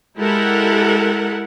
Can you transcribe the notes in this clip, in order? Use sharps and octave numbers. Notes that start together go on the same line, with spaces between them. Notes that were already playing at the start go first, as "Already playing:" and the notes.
G#3 E4 G4 A4 A#4 F#5